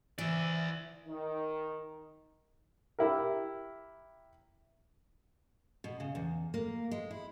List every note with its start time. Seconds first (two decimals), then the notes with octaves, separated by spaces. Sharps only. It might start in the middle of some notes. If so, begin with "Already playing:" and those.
0.18 E3 D5 E5
1.06 D#3
2.99 E4 G4 A#4
5.84 B2
6.00 C#3
6.15 E2
6.54 A#3
6.91 G#3
7.11 E4